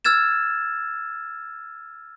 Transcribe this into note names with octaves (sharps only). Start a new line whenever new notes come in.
E6 F6 G#6 A6 E7